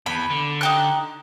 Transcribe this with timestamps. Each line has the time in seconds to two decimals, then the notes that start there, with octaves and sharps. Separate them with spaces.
0.06 E2 B5
0.30 D3
0.61 D#4 G4 F#6